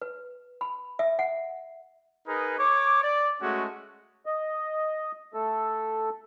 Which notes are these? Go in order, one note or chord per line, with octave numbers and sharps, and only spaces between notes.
B4
B5
E5
F#5
D#4 G#4 A#4 B4
C#5 D6
D5
G#3 A3 C#4 F#4
D#5
A3 A4